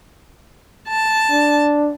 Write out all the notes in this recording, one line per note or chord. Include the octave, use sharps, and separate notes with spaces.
A5
D4